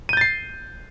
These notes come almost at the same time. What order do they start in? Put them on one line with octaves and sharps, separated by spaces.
D#7 G6 A6 C7